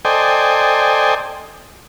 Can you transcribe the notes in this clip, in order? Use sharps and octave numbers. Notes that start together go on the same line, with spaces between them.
A4 C5 D5 D#5 G5 G#5